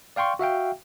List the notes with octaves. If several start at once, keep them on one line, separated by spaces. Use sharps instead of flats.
D5 F5 G5 C6 C#6
F#4 E5 F5 G5